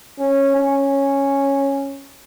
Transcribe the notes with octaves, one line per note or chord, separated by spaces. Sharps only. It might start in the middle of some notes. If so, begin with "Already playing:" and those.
C#4
C#4